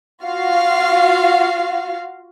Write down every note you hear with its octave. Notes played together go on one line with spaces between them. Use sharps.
F4 F#4 F5